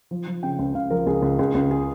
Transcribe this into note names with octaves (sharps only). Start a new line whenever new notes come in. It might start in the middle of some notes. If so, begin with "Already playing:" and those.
F3
F3
C#3 G5
C#2
C#2 F5
F3 A#4
C#2 G#4
C#2
C#2 G#4
C#2
G#4